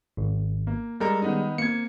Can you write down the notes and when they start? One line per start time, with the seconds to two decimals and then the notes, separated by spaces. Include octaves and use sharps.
0.17 G#1
0.67 A#3
1.00 G3 G#3 A4 A#4 A#5
1.22 D#3 B3 D#4
1.58 A#3 C4 G#6 C#7